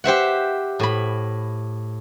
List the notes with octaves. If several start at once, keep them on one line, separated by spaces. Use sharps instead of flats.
G4 C5 E5 F#5
A2 B5